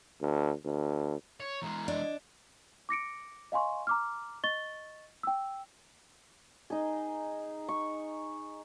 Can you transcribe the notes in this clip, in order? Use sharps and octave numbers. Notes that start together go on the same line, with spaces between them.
D2
D2
C#5
E2 G#3 A#5
D4 D5 D#5
D6 A#6 C#7 D7
D#5 F5 G#5 C6 C#6
A#5 D6 F6
D#5 C#6 A6 G7
G5 E6
D#4 G#4
C#6